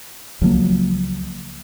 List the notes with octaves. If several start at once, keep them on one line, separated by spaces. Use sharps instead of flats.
C#2 F3 F#3 A#3